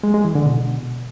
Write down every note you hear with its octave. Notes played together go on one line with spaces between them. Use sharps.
G#3
G#3
E3
D3
B2